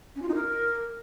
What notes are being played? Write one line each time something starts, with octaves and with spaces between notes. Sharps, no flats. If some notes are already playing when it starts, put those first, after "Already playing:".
C#4
F4
D#4
A#4